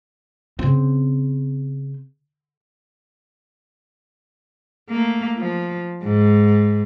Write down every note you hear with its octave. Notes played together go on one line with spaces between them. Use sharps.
C#3 C4
A3 A#3
F3
G#2